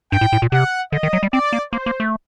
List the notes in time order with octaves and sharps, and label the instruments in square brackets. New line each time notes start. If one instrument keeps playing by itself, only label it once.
[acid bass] G2 [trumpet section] G5
[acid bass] A2
A2
A#2
[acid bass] C3 [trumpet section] F#5
[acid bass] D3 [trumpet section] D#5
[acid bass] D#3
F#3
G3
[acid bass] C4 [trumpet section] D5
[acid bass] A#3
[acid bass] A#3 [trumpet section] C5
[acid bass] A#3
A3